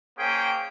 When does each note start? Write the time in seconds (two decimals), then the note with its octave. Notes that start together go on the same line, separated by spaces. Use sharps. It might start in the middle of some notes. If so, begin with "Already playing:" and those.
0.17 A#3 C#4 G#4 C5 G5